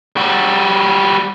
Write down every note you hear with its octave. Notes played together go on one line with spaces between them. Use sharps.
G3 F#4